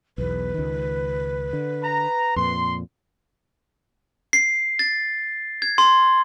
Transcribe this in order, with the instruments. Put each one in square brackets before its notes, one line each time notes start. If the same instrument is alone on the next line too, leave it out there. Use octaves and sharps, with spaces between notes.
[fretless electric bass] B1 E2 [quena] B4
[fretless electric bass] C#2 D#3
D3
[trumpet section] A#5
[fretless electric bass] F2 A#2 [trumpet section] C6
[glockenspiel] C7
A6
G#6
C6